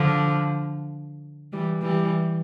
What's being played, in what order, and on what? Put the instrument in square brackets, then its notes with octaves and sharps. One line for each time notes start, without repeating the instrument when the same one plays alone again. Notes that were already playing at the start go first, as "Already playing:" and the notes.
Already playing: [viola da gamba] D3 F3
E3 G3
E3 G3